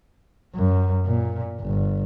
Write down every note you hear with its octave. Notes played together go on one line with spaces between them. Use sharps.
F#2
A#2
G1